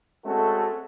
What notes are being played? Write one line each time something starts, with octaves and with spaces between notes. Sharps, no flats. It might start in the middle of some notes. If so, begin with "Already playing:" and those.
G#3 A3 C4 C#4 F#4 A4